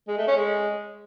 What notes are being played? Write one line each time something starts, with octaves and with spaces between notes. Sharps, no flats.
G#3
A3
C#4
G#3